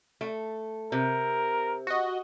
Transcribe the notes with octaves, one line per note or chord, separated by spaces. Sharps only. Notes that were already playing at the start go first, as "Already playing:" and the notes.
A3
C3 A#4
F#4 D#5